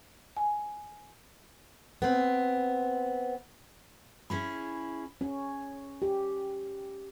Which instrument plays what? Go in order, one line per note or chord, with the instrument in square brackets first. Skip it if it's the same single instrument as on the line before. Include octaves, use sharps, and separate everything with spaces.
[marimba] G#5
[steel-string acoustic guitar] B3 C4
[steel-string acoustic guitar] C#4 E4 G#4 [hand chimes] B5
[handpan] C#4
G4